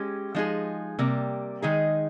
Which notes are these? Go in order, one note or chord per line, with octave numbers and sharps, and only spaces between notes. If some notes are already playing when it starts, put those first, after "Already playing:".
Already playing: G#3 C#4 G4
F3 G#3 D#4 G#4
C3 G3 A#3
D#3 G#3 D#4 G#4